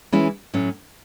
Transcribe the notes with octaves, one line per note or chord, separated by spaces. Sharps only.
E3 G#3 C#4 E4
A2 F#3 C#4